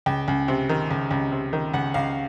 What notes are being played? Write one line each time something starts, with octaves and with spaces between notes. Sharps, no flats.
C#2 G5
C#2
C3
D#3
C#2
C#2
C3
D#3
C#2 F#5
C#2 F5